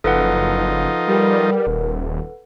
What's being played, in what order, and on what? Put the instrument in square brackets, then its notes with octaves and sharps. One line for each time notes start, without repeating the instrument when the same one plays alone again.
[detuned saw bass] F#1 [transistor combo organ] F3 D#4 [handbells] A4 B4 F#5
[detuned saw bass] G3 [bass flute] A#4
[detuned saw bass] D#1